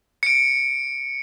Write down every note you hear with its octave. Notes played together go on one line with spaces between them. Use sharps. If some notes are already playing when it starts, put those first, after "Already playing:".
C#7 D7